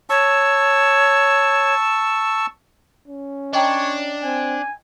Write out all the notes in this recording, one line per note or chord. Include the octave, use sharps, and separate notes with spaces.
C#5 A5 C#6 E6
C#4
D4 C#5 D#5 G5 A#5
C4 G#5